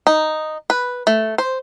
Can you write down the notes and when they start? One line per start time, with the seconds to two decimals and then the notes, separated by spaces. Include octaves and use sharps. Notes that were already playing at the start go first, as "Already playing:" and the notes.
0.07 D#4
0.70 B4
1.07 A3
1.38 C5